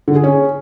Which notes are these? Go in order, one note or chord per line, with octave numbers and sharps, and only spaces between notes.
D3
G#4
C#4